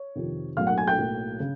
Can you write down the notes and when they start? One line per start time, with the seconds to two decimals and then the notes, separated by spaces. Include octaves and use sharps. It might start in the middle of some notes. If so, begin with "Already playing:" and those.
Already playing: C#5
0.15 F2 C3 D#3
0.57 B1 A2 F#3 A#3 F5 F6
0.67 F#5 F#6
0.78 G#5 G#6
0.88 G5 G6
0.98 B1 A2 F#3 A#3
1.40 C#3